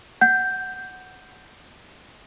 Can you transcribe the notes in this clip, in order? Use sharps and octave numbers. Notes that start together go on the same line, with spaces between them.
F#5 G6